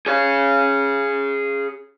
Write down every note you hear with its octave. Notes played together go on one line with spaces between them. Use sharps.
G#4 C#5